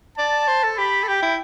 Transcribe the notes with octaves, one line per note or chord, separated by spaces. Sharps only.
D5 A5
C5
A4
G4 B5
A4
G4 G5
E4